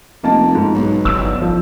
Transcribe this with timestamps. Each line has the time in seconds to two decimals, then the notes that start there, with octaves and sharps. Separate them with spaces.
0.24 F1 A#3 D#5 A5
0.55 G#2
0.74 B1
1.05 G1 E6
1.41 F3